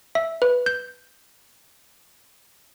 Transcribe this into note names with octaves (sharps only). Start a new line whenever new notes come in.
E5
B4
G6